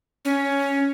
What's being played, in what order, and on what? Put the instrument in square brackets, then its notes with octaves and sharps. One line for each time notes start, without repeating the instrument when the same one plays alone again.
[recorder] C#4